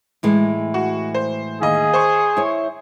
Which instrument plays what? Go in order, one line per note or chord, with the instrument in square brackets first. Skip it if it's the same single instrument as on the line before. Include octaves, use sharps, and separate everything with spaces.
[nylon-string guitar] A2 E3 G#3
[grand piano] F#4
C5
[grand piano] D#2 D#5 [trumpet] G#4
[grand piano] C5 C#6
[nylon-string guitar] E4 C#5